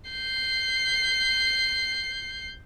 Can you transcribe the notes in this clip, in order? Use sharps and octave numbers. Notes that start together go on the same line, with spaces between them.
G6 C7